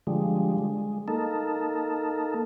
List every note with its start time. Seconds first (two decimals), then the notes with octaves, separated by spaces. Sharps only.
0.07 D3 F3 G3 G#3
0.58 G#3
1.08 A#3 D#4 A4